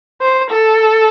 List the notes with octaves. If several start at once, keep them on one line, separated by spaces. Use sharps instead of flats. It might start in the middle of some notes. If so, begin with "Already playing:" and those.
C5
A4